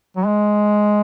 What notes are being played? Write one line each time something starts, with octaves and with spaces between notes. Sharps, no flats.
F#3
G#3